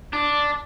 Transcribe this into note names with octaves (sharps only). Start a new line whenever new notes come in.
D4